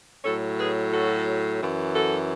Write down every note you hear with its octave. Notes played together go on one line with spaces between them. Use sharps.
A2 F#3 A4 C#5
G#4 B4
F#4 A4
F#2 E3
F#4 A4